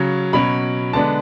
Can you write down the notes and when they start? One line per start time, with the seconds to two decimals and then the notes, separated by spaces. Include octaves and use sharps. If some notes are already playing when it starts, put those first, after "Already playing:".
Already playing: C#3 F#3 C#4
0.33 B2 F#3 C#4 B5
0.93 D3 G#3 B3 D4 A5